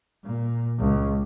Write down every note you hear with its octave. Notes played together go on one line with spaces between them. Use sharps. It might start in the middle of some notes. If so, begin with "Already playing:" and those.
A#2
C#2